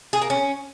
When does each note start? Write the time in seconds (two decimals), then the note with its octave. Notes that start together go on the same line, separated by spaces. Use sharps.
0.13 G#4
0.21 A#3
0.30 C#4